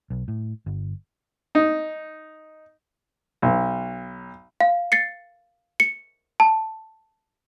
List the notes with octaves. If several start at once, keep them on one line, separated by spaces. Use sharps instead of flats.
B1
A2
G1
D#4
B1
F5
A6 C7 C#7
C#7
A5